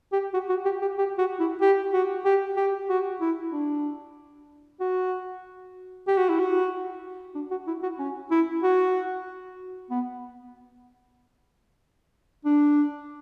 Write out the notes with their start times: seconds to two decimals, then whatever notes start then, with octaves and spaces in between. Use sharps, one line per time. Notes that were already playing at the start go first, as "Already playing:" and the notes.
0.12 G4
0.33 F#4
0.49 F#4
0.65 G4
0.82 G4
0.98 G4
1.18 F#4
1.40 E4
1.61 G4
1.93 F#4
2.25 G4
2.56 G4
2.89 F#4
3.21 E4
3.52 D4
4.80 F#4
6.08 G4
6.18 F#4
6.29 E4
6.40 F#4
7.35 D4
7.51 F#4
7.67 E4
7.83 F#4
7.99 C#4
8.31 E4
8.63 F#4
9.90 B3
12.45 D4